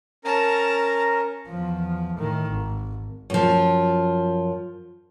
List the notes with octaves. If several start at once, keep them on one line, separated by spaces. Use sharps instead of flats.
C#4 A#4 A5 A#5
E2 F3
A2 D#3
G#1
F#2 F3